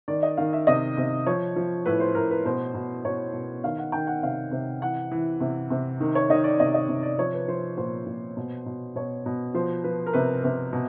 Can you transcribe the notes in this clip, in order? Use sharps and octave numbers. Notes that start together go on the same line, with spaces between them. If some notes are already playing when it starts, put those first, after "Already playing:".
D#3 D5
D#5
D#3 F5
E5
C3 D#5
C3
F3 C#5
F3
A2 B4
C5
A2 A#4
B4
B2 C5
B2
B2 C#5
B2
D#3 F5
F#5
D#3 G5
F#5
C3 F5
C3
E3 F#5
E3
C3
C3
D#3
C#5
D#3 D#5
D5
C3 D#5
D#5
C3
D5
F3 C#5
B4
F3 C5
A#2 C5
A#2
B2
B2
B2 C#5
B2
F3 C5
F3 B4
A#4
C3 B4
C3 B4
B2